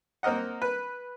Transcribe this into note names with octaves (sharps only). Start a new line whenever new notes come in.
A#3 C4 A#4 D#5 F#5
B4